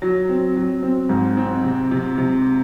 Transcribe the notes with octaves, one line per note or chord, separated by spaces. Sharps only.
F#3
C4
F#3
C4
G#2
C4
C3
C3
C3